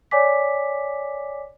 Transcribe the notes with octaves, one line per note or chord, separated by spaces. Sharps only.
C#5 D5 G#5 D6 B6